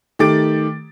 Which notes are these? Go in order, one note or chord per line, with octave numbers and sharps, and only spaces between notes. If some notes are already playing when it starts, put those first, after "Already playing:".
D#3 A3 G4 D6 A6 D7